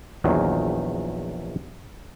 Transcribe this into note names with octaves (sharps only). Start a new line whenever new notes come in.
A#1 E2 D#3 F#3